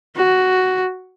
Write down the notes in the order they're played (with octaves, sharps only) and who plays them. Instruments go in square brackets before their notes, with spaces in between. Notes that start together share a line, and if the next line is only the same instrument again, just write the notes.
[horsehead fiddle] F#4